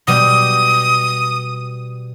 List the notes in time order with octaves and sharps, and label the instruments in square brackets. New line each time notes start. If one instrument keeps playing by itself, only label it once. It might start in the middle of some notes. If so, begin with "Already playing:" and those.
[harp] B2 G3 G6 [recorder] D#6